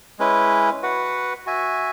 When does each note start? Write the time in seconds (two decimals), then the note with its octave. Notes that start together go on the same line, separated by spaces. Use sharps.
0.19 G#3 C#4 E4 B4
0.83 F#4 B4 F#5
1.46 F#4 E5 G#5